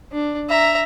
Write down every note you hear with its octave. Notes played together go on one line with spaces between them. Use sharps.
D4
E5 A#5